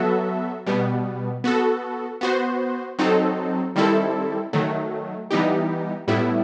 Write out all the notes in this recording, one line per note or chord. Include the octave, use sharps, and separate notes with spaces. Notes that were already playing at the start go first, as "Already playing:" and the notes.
Already playing: F#3 B3 F#4 A4 E5
B2 G3 B3
B3 F#4 A4
B3 F#4 C5
F#3 C4 D#4 A4
D#3 G3 C4 E4 A4
D#3 F#3 A3
E3 G3 B3 D#4 G4
A2 G3 B3 E4